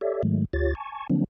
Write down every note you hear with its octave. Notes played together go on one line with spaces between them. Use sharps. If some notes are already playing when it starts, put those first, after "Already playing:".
G4 A4 C#5 D5 E5
G#2 D#3 F#3 G#3 A3
D2 F4 G4 C#5 A6
G#5 A5 C#6
D3 F3 F#3 A#3 C4 D4